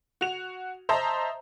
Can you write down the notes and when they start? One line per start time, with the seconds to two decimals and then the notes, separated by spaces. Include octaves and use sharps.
0.21 F#4 F7
0.89 C5 D#5 E5 A5 A#5